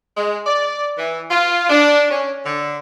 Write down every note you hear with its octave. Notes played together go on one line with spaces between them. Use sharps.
G#3
D5
E3
F4
D4
C#4
D3